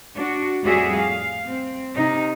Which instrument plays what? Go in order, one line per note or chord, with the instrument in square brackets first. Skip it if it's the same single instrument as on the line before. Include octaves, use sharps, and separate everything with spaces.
[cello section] D4 F#4
F2 A2 G3 F#4 G#4 E5
F5
C4
C3 D#4